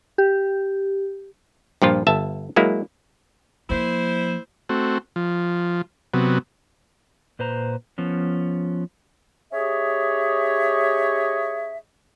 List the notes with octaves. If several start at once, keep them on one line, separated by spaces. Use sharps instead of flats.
G4
G2 A#2 F3 F4
G1 E5 A5
F#3 G#3 A#3 E4
F3 A#3 E4 C5
A3 C4 F#4
F3
C3 F#3 B3
A#2 B4 C5 A#5
F3 B3 C#4
C#4 G4 G#4 C#5 D#5 E5